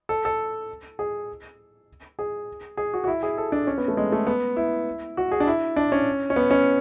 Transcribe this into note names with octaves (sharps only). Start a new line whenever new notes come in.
A4
A4
G#4
G#4
G#4
F#4
F#4
E4
G#4
A4
D4
C#4
B3
A3
G#3
A3
B3
E4
F#4
G#4
D4
E4
D4
C#4
C#4
B3
C#4